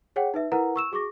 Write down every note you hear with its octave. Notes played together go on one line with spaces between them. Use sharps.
G#4 C#5 F#5 G5
D#4 B4 E5
E4 A#4 B4 F#5 A#5
C#6 E6 E7
F#4 G#4 C#6 D6 A#6